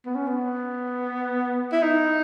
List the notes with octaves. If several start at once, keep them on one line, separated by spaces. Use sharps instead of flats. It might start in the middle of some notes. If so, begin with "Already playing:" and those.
B3
C#4
B3
E4
D#4